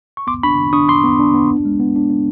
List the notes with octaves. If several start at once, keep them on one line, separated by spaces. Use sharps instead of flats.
C#6
B3 C6 D6
D4 B5 C#6
D#3
D4 C#6 D#6
D4 C6 D6
B3
D4
B3
D4
G#3
B3
D4
B3